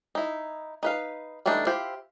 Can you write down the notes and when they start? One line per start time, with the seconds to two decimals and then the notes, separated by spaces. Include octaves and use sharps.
0.15 D#4 E4
0.83 D#4 B4 F5
1.46 E3 G3 A3 D4 D#4
1.67 E4 F4 G4 C5